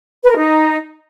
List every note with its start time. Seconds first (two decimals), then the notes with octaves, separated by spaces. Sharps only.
0.23 B4
0.30 A#4
0.36 D#4